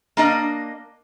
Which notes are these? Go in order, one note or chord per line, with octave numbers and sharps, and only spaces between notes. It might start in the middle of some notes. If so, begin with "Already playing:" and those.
A#3 D4 D#5